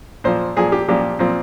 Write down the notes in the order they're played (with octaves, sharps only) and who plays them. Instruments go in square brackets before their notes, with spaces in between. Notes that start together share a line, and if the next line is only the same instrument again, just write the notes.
[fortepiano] A#2 F3 C5
A#2 F3 G#4
G4
A#2 F3 G4
A#2 F3 C4